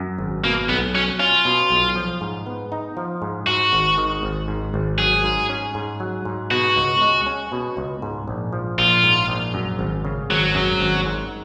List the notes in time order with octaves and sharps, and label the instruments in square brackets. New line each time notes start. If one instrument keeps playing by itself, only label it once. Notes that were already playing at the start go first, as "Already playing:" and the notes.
Already playing: [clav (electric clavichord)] F#2
G#1
[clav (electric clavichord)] B2 [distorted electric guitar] A#3
[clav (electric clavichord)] B1 [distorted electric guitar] B3
[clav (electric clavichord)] F#3 [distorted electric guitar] C#4
[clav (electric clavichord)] C#4 [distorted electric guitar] F4
[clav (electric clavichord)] B2
B1
F3
G#2
B3
D#4
F3
G#2
[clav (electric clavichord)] G#2 [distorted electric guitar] F#4
[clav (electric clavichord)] G#1
D#3
G#1
G#2
G#1
[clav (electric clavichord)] F#3 [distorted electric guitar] G#4
[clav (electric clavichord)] G#2
C#4
G#2
F#3
G#2
[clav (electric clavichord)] B2 [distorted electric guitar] F#4
[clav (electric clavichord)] C#2
G#3
C#4
B2
C#2
G#2
A#1
F3
[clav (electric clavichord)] A#1 [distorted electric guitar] F4
[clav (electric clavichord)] G#2
A#1
F#2
G#1
C#3
[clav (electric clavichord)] G#1 [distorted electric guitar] F#3
[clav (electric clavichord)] F#2
G#1
G#2